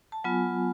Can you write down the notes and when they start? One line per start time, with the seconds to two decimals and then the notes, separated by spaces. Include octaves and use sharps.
0.12 A5
0.24 F#3 B3 F4 G#5